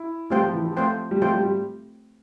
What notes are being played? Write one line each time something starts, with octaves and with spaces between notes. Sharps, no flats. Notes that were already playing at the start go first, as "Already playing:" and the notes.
Already playing: E4
G3 A3 C4 F4 C5 G5
F3
E3
F3
A3 C4 F4 C5 G5
G3
F3 A3 C4 F4 C5 G5
G3
G3